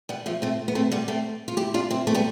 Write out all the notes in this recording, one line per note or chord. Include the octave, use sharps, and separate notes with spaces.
G3 B3
F3 A3
A3 C4
B3
A3 C4
G3 B3
A3 C4
F4
E4 G4
D4 F4
C4 E4
A3 C4
G3 B3